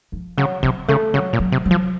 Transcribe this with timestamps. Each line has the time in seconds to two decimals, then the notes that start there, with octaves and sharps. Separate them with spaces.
0.12 F3
0.37 C#3 F#3
0.63 C3 F#3
0.88 C#3 A3
1.14 C#3 F#3
1.33 A#2
1.39 F#3
1.52 C3
1.65 F#3
1.71 F3